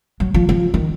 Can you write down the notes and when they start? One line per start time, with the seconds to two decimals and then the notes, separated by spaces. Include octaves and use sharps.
0.20 F#3
0.34 F3
0.49 F3
0.74 D#3